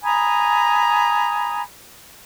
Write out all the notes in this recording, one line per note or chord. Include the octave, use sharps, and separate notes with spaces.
G#5 A#5 B5 D#6